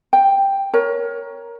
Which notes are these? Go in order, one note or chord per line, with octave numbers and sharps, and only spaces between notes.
G5
A#4 C#5